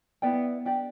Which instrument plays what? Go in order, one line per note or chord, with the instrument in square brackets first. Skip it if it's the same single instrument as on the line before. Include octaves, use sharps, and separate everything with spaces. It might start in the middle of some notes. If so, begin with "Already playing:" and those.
[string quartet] B3 [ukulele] E4 B4 D5 G5
[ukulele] D4 G4 D5 G5